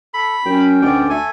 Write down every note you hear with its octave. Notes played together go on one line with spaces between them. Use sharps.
A4 B5
F#2 C#4 G5
D2 G#3 B3 D5 G5
A3 A4 G#5